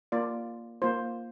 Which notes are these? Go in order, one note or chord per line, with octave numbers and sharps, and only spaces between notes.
A#3 F4 D5
A#3 F4 C5